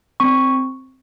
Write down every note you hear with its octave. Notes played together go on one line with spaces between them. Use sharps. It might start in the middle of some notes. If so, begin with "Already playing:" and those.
C4 C#6